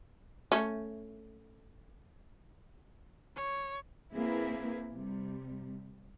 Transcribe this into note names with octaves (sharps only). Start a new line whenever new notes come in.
A3 C#4
C#5
A#3 C4 E4 G#4 B4
C3 G3